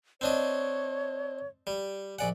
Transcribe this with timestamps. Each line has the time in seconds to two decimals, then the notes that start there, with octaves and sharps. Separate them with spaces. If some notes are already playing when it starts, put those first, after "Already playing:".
0.21 C4 D4 C#5 D#5
1.67 G3
2.19 A#1 D5 F#5 G#5